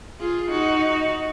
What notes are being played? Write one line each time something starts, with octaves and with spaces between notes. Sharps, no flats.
F4 G#4
D#4 F#4